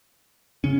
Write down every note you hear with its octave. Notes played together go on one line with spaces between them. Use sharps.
C#3 C#4